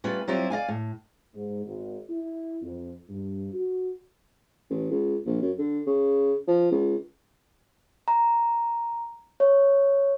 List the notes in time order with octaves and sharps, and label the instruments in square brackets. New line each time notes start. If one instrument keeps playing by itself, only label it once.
[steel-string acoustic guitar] G3 A3 C#4 F4 B4
F#3 G3 C4 E4 F4 G4
D5 D#5 F5 G#5
A2
[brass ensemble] G#2
G#1
E4
F2
G2
F#4
[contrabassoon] A1
C#2
A#1
F#2
D3
C#3
F3
C#2
[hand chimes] A#5
C#5